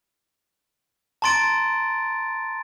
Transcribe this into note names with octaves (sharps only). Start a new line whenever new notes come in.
A5 A#5 C6 A6 D7